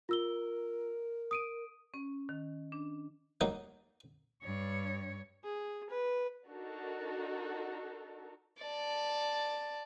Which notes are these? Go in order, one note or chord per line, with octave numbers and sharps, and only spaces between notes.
F4 A#4 E6 G7
D#6 D7 D#7
C#4
D#3
D4
F#3 G3 A#3 D#4
G2 C#5
G#4
B4
D4 D#4 F#4 A4 A#4
D5 A5